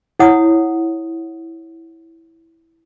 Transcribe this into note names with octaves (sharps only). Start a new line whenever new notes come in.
E4 C#5 F#5 D#6